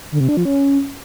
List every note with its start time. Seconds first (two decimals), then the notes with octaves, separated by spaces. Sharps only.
0.12 D3
0.20 C3
0.29 D4
0.37 F3
0.45 C#4